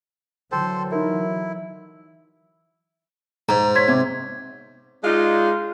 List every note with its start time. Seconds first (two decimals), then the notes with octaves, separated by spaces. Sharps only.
0.52 D3 E3 F#3 A4 C5 G5
0.91 D#4 E4 A#4
3.49 G#2 A#5
3.75 C#5 C6 G#6 B6
3.88 C3 D6 G#6
5.04 G#3 D4 D#4 F4